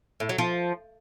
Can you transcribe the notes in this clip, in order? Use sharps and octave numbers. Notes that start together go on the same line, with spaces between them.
A2
F#3
F3